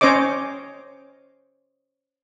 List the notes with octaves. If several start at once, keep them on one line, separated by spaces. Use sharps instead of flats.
C#4 C5 C#5 D#5 D6